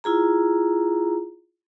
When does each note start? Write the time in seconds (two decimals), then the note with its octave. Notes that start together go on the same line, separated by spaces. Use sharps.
0.04 E4 F4 G#4 A#5